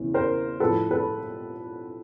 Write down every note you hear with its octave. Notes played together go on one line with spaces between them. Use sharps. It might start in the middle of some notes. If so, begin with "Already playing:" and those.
Already playing: E2 C#3 E3
A#4 C5
A2 F3 A4 B4
A4 B4